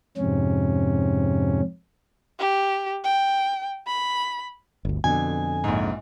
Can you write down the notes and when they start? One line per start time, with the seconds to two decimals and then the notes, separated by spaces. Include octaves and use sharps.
0.18 F2 G#2 C3 C#4
2.40 G4
3.04 G5
3.87 B5
4.85 G1 D2
5.04 F2 B2 D3 G#5
5.64 A#1 G#2